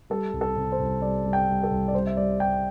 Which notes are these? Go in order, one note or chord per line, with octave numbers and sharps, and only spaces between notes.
G3 A4
C2
A4
C3
C5
C2
G3 D5
G3
G5
G3
A4
C2
D5
G3 C5
E5
G3 D5
G3 G5